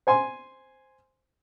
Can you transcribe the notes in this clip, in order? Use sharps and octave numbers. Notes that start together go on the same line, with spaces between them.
C5 G#5 C6